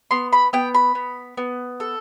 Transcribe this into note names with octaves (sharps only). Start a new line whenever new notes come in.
B3 C6
B5
B3 G5
B5
B3
B3
A4